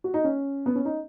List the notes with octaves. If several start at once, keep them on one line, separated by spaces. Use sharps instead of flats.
F#4
D#4
C#4
B3
C#4
D#4